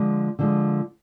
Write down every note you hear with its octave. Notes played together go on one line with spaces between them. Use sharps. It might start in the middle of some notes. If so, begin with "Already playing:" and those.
Already playing: D3 F3 G#3
D3 F3 G#3